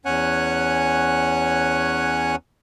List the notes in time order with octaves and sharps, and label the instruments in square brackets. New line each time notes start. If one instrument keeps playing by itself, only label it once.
[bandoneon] E2 C#4 C#5 F#5 G#5 F#6